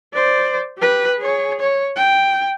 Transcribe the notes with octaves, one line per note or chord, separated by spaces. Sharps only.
C5 D5
G4 B4
G#4 C#5
C#5
G5